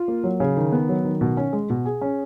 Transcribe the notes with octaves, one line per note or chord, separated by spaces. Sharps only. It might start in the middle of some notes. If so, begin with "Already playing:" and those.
Already playing: F4
A#3
F#3
C#3
D#3
B3
F#3
D#3
B2
C#4
G#3
B2
G#4
C#4